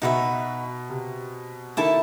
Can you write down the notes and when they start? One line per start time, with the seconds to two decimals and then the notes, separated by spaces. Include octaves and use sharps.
0.02 B2 D#4 F#4 B4 E5
0.90 C3
1.77 D#3 E4 A4 E5 A5